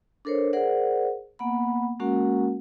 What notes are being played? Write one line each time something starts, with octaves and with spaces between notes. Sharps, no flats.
D4 A4 A#4 C5 C#5
G#4 A#4 C5 D5 F#5
A#3 B3 F#5 B5
G#3 A#3 C#4 F#4 A#4 F#5